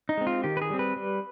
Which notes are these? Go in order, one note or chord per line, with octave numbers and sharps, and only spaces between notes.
D#4
G#3 C4
F4
D#3 G4
B4
G#4
G3 C4
B4
G3